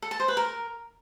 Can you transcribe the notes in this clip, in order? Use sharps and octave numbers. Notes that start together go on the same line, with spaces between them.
A4
A5
C5
B4
A#4